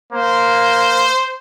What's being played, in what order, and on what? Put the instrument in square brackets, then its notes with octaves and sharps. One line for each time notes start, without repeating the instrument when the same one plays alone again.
[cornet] A#3 [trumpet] C5